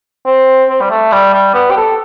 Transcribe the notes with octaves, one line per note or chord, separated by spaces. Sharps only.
C4
C4
G3
A3
G3
G3
B3
G4
A4